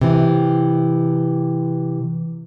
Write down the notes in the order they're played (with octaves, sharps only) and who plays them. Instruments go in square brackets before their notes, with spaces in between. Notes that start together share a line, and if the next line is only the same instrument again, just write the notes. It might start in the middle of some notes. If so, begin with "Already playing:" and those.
[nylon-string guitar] C3 E3